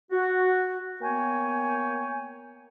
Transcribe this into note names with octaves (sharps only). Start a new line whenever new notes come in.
F#4
A#3 B3 C#5 G5 G#5